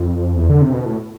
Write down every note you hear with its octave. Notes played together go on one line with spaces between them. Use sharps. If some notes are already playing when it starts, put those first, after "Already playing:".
Already playing: F2
E2
D3
C3
B2
A2